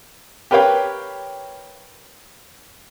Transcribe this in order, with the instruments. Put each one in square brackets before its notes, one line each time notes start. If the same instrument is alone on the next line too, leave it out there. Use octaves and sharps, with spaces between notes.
[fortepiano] G4 A#4 B4 C#5 F5 G5